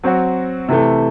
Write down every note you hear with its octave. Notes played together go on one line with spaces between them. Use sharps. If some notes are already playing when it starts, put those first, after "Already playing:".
F#3 C4 F#4
C3 E3 A3